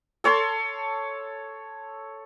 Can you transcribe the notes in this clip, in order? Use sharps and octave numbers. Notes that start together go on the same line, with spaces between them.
A4 C#5 A5 C6